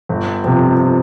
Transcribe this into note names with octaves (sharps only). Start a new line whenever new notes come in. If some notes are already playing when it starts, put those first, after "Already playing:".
G1
F2 C3